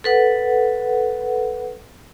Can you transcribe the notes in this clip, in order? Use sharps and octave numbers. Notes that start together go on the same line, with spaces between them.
A4 B4 F#5